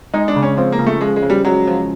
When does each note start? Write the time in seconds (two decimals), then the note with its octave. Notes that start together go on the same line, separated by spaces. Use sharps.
0.14 G#3 D#4
0.28 D4
0.36 C#3
0.42 C#4
0.57 F3 C4
0.72 A#3
0.79 C#3
0.86 A3
1.01 F3 G#3
1.16 G#3
1.22 C#3
1.30 G3
1.44 F#3 G#3
1.67 F3